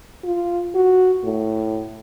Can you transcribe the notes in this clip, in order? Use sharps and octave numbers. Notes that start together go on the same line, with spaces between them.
F4
F#4
A2